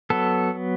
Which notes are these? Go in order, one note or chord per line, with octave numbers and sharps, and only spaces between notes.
F#3 B3 A4